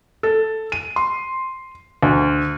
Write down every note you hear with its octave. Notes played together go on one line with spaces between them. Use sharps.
A4
D#7
C6
D2